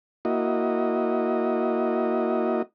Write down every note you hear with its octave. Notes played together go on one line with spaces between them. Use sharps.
A#3 E4 F#4 D#5